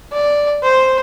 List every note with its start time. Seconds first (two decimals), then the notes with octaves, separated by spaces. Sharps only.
0.13 D5
0.64 C5